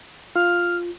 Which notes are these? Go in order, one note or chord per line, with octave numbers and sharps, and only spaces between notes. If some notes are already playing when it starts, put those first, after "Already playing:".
F4 F6